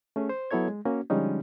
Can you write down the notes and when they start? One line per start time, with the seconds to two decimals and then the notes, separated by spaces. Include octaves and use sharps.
0.16 A3 C#4 G#4
0.29 C5
0.51 F#3 B3 E4 A4 C#5 G#6
0.68 G#3
0.85 A#3 C#4 F#4
1.10 D3 F3 G3 G#3 C#4 D#4